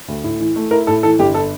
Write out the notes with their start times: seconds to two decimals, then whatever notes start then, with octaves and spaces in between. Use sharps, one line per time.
0.08 D2
0.24 A2
0.40 E3
0.56 A3
0.71 E4 A#4
0.87 A2 A4
1.03 E3 A4
1.19 G1 G4
1.35 A4